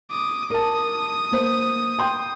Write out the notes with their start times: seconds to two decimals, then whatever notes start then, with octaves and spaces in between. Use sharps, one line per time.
0.11 D6 D#6
0.50 A#4 A5 D#6
1.32 A#3 C5
1.99 G5 C6 G6